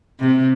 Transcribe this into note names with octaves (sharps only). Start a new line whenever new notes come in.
C3